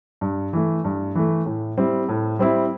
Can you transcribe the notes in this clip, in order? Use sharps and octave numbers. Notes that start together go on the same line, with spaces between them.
G2
E3 A3
G2
E3 A3
A2
G3 C4 E4
A2
G3 C4 E4